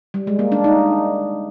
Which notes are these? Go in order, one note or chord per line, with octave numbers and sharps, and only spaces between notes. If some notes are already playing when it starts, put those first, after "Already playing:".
G3
G#3
A#3
D4
D#4